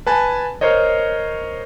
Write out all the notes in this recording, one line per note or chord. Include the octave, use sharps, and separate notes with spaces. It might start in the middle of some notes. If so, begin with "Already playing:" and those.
B4 G#5 A5
A#4 C5 C#5 D#5